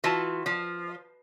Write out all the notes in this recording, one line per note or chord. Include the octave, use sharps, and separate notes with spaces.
E3 F4 F#4 A5
F3